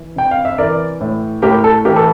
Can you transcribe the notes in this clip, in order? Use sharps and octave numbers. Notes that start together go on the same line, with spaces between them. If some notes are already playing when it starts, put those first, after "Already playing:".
Already playing: E3
C3 G5
F5
E5
E3 A#4 D5
A2
A2 G4 A#4
A4
E3 G4 A#4
A4